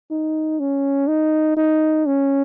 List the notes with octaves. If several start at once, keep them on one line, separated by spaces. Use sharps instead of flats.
D#4
C#4
D#4
D#4
C#4